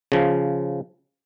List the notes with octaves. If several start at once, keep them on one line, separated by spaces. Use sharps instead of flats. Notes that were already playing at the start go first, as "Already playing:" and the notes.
C#3 F3